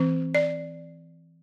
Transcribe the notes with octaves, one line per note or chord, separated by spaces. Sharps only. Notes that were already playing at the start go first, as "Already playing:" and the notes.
Already playing: E3 C4
D5